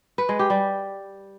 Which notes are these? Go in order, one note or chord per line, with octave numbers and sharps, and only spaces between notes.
B4
G#3
G4
G3